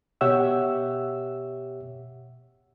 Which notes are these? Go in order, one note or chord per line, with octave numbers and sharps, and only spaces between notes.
B2 G4 C#5 E5 F#5 E6